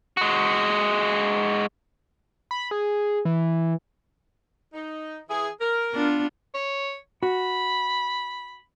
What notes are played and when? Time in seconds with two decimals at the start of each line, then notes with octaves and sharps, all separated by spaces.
0.17 G#3 F#4
2.51 B5
2.71 G#4
3.25 E3
4.74 D#4
5.30 E3 E4 G#4
5.60 A#4
5.93 B3 D4 F4
6.54 C#5
7.23 F#4 B5